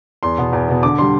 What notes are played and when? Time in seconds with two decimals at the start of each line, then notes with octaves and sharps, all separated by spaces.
0.23 E2 C6
0.38 B2 B3
0.53 E2
0.68 B2 B3
0.83 D3 D6
0.98 G3 D4 C6